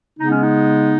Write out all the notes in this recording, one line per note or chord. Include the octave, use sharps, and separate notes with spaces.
C#3 G#3 B3 D#4
C#4
D#4